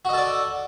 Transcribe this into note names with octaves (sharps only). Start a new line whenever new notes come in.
F#4 A4 D5 D#5